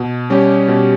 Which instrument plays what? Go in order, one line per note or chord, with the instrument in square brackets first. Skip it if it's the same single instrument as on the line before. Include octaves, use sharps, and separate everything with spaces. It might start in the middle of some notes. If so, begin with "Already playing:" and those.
Already playing: [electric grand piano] B2
G3 C#4 G4
B2